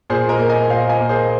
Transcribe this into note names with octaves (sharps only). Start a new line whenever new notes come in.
A#2 G#4 C5
A#4 D#5
A#3
D#5 G#5
A#2 C5 F5
D#5 G#5
A#3
G#4 C5